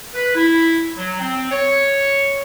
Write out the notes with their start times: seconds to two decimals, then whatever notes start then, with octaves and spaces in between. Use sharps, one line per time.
0.15 B4
0.35 E4
0.97 F#3
1.20 C4
1.52 C#5